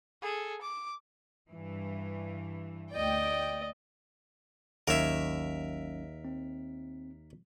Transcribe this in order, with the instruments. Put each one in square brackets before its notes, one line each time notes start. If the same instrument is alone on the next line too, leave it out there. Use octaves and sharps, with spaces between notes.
[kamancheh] G#4 A4
D6
[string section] G2 E3
[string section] D2 G5 [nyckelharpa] D5 D#5
[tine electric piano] G#1 F#3 C#4 [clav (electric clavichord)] D#2 [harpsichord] A#4 E5
[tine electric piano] C4